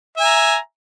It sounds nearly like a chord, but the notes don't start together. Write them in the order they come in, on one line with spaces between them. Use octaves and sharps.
E5 G#5 A#5